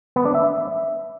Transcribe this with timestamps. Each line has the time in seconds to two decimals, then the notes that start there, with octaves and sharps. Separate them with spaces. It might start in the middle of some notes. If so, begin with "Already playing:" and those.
0.16 B3
0.25 D4
0.35 E5